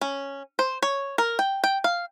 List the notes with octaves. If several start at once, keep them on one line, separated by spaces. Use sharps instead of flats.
C#4
C5
C#5
A#4
G5
G5
F5